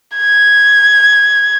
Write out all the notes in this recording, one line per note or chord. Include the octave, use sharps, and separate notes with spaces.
G#6